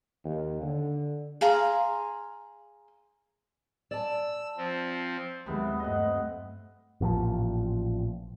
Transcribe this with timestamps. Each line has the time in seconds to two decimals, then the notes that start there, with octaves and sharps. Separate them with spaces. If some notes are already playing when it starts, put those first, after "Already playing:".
0.24 D#2
0.62 D3
1.41 G#4 F5 A#5 C6
3.91 D5 A5 E6
4.57 F3 C4
5.46 D#2 C3 E3 F#3 G#3 B3
5.80 G2 A3 C4 D#5 F#5
7.01 A1 A#2 C#3 F3